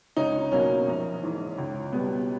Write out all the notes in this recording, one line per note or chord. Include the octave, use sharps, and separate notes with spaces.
C#2 C#4 D#4
B2 F#3 A#3 C#4
A#1
G#2 E3
C#2
B2 G3 B3